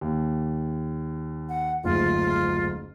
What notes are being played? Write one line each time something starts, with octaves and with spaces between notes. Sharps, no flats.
D#2
F#5
F#1 D2 G#2 F4